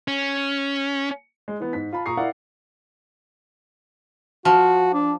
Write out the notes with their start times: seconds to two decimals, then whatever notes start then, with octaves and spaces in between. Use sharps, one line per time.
0.08 C#4
1.48 G#3
1.60 E3 B3
1.73 G#2 B6
1.93 F4 A5 B5
2.06 A#2 A#5 C#6 D#6 C7
2.17 E4 A#4 D5 F5 F#5
4.45 F3 F#4
4.94 D4